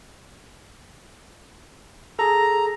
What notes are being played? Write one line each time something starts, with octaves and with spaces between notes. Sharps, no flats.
G#4 A4 A#5